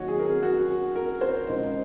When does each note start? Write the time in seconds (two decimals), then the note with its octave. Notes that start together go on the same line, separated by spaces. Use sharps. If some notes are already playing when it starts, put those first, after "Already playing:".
Already playing: D#2 D#3 F#3 F#4 C#5
0.08 G#4
0.19 A#4
0.25 G#4
0.43 F#4
0.96 A#4
1.21 C5
1.47 C#2 C#3 G#3 D#4